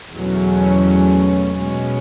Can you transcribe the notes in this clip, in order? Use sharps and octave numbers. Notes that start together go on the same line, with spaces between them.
E2 B2 F#3 A3 C#4
B2 G#3 C#4